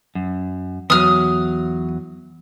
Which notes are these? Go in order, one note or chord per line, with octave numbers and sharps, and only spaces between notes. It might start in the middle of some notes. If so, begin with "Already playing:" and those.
F#2
E2 F#3 D#6 F6